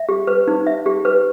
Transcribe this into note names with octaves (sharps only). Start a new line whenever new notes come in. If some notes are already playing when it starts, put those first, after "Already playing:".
Already playing: E5
G4
B4
D#4
E5
G4
B4